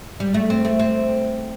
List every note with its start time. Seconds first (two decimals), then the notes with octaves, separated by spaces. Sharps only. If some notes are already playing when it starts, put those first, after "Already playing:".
0.20 G3
0.34 A3
0.50 C4
0.65 A3
0.79 C4